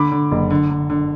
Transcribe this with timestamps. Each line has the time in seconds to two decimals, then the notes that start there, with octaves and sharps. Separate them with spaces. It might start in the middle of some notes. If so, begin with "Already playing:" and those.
Already playing: D3 B5 D6
0.12 D3
0.31 F#1
0.51 D3
0.70 D3
0.90 D3